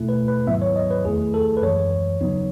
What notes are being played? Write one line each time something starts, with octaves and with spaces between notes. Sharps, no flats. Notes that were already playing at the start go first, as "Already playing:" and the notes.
Already playing: B2 A3 E4
B4
B4
G#2 D#3 F#3 B3 E4 E5
C#5
D#5
B4
E2 D#3 A3 E4 G#4
A4
B4
F#2 E3 G#3 C#5
C#3 F#3 B3 D#4